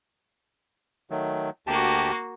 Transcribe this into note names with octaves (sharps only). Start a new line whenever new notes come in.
D#3 F#3 A3
D2 A#3 F#4 G4 A5